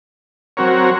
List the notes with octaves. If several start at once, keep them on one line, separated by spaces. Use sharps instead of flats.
F#3 C4 F#4 A#4 C#5